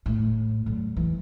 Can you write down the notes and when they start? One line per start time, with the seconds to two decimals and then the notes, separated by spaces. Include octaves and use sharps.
0.06 A2
0.66 D3 F#3
0.97 E3